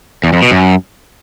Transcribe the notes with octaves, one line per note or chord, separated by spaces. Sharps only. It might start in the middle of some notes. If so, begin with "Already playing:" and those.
E2
F2
B2
F#2